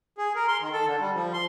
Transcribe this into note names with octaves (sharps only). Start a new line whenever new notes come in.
G#4
A#4
C6
D#3
A4
D3
G3
F3
C6